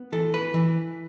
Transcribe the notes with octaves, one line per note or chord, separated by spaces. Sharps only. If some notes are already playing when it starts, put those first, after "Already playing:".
Already playing: B3
E3 A4
B4
E3